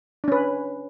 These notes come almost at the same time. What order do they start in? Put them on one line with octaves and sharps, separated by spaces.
D4 C#4 B4